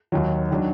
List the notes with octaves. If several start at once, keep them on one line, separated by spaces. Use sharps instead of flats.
D#2 D#3 F#3
D#3 F#3 D4